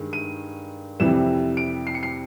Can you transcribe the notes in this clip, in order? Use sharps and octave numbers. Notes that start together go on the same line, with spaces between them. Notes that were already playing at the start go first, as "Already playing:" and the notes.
Already playing: G2 D#3 G#3
D#7
F2 C3 E3 G3 E7
D7
C7
C#7
C7